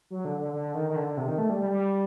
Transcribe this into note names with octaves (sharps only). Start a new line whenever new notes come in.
F#3
D3
D3
D3
D#3
D#3
D3
D3
C3
D#3
A3
G3
G3
G3